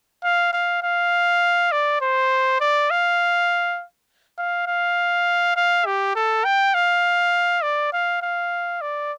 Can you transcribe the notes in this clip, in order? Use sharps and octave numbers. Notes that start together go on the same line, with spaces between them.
F5
F5
F5
D5
C5
D5
F5
F5
F5
F5
G4
A4
G5
F5
D5
F5
F5
D5